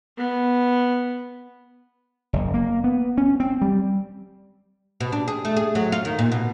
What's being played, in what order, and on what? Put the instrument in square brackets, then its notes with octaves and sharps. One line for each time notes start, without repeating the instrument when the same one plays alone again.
[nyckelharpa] B3
[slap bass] F#1
A#3
B3
C#4
C4
G3
[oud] B2
D4
G#4
A3
G#4
F#3
F4
D#3
A#2
B2